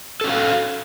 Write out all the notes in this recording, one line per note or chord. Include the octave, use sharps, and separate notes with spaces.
C#4 F#4 A4 F5